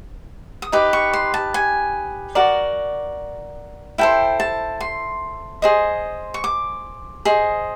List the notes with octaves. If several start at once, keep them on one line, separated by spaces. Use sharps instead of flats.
D#6
D#4 G4 B4 D6
C#6
C6
A5
G#5
F#4 A#4 D5
E4 A4 C5 G5
A5
C6
G#4 C5 D#5
C#6
D6
G#4 C5 D#5